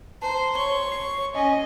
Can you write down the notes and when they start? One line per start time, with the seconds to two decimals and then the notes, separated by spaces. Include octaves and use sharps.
0.22 C5 A5 A#5
0.56 C#5 C6 C#6 G7
0.92 C7
1.35 C#4 D#5 G#5